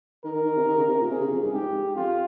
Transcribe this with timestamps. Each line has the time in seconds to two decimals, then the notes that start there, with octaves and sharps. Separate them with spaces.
0.24 D#3 A#4
0.35 D#3
0.45 D#3
0.57 C3
0.68 D#3
0.77 C#3
0.89 C3
1.00 A#2
1.11 C3 G#4
1.20 C#3
1.31 F2
1.43 G2
1.53 G#2 G4
1.96 F2 F4